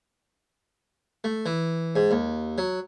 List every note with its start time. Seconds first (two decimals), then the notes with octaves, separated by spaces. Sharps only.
1.24 A3
1.46 E3
1.96 G#2
2.11 D#2
2.58 F#3